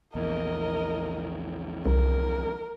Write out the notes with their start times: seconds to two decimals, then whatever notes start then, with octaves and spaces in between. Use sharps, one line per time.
0.15 A#1 E2 A#4 D#5
1.86 C2 A#4